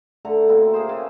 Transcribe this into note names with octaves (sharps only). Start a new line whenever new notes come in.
D3 A3 A4 A#5
B2 A#3 C4 E4
A#3 G#4 C5
C#3